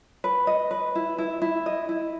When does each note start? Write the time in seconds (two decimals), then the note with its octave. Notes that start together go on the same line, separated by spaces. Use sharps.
0.24 B4
0.47 D#5
0.71 B4
0.95 E4
1.18 E4
1.42 E4
1.66 D#5
1.89 E4